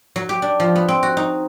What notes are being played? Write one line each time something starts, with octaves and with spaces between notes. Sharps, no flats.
F#3
G4
D4
F3
B3
C4
F#4
D#4